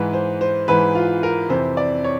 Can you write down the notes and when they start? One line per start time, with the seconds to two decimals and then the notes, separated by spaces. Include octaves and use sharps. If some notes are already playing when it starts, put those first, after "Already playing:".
Already playing: G#2 E3 B4
0.13 C5
0.41 C5
0.68 G#2 E3 B4
0.95 F4
1.23 A#4
1.50 F2 C3 E3 C5
1.77 D5
2.04 C#5